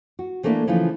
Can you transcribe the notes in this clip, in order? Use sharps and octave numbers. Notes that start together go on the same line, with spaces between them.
F#4
E3 A3 A#3 C#4 D4 E4
C#3 E3 F3 A3 D#4 F4